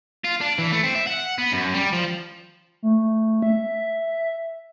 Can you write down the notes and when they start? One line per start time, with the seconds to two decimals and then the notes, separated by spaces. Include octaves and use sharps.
0.24 F4
0.41 D4
0.58 E3
0.72 A3
0.84 C4
0.95 E5
1.07 F#5
1.38 B3
1.52 F#2
1.74 G3
1.93 F3
2.83 A3
3.42 E5